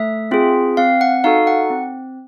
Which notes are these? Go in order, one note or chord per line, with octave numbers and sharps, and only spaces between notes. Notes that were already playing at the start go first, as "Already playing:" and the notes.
Already playing: A3 E5
C4 F4 G#4
C4 F5
F#5
D#4 F#4 A4 F5
F#5
C4